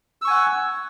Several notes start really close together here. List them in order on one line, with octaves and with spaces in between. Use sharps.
E6 C#6 G#5 F#5